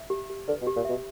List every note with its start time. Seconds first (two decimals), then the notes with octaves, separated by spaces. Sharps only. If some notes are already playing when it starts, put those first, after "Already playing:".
Already playing: E5
0.10 G4
0.30 G4
0.48 D3 B4
0.61 B2
0.67 G4
0.76 A#2
0.85 B2 E5